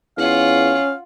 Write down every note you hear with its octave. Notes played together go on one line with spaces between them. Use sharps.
E2 C#4 F4 F5 F#5